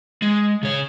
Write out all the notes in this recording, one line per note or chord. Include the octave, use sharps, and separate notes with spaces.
G#3
C#3 C#5